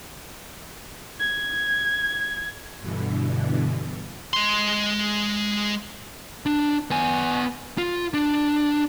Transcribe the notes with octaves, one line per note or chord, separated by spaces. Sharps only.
G#6
G2 B2 D3 E3
G#3 C6
D4
B3 G#5
F4
D4